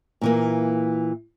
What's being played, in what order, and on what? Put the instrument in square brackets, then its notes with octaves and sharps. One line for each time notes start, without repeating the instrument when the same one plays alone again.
[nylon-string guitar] A#2 E3 A#3